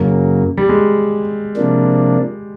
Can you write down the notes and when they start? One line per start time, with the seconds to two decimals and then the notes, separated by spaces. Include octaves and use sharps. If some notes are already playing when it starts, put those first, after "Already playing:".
Already playing: F#2 C#3 F#3 A#3
0.57 G3
0.69 G#3
1.57 C3 F3 A#3 D4